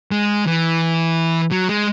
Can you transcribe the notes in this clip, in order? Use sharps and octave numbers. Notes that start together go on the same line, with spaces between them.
G#3
E3
F#3
G#3